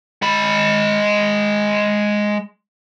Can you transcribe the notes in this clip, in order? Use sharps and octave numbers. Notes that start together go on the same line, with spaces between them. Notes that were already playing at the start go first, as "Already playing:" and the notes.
G#3 B5